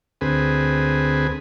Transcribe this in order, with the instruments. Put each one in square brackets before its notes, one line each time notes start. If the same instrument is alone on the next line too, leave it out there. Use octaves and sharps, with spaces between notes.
[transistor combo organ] D2 C4 G#4 B4